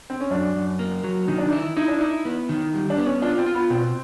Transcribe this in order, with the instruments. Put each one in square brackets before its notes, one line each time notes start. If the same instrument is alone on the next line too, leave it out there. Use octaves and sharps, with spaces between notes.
[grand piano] C4
C#4
[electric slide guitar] F#2 [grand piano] D4
[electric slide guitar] F#2
A#3
F#3
[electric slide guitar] D#3 [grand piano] D#4
[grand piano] D4
D#4
[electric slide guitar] E4
[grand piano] D#4 [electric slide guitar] E4
[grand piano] D4
[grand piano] D#4 [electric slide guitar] E4
[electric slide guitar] B3
D#3
G3
[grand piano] D4
[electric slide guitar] B3
[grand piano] C#4
[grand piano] D4 [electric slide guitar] F4
[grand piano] C4
[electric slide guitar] F4
[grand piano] B3
[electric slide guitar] B2 [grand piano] C4